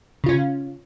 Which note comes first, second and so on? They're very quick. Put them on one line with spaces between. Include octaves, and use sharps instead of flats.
C#3 F4 C#4